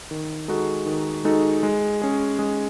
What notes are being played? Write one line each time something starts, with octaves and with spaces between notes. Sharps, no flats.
D#3
G#3 D#4 F#4 A4
D#3
G#3 D#4 F#4 A4
G#3
C#4 G#4
G#3